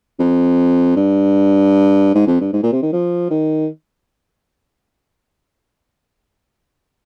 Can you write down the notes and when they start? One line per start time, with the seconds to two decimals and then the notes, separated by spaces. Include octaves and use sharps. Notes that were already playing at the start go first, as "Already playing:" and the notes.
0.20 F2
0.97 G2
2.15 G#2
2.27 F2
2.41 G2
2.53 G#2
2.63 A#2
2.72 C3
2.83 D#3
2.93 F3
3.31 D#3